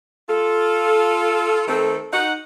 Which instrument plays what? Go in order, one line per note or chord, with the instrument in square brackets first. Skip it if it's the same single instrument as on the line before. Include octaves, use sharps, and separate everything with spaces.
[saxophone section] F4 A4
D#3 A3 C4 A4
D#4 F#5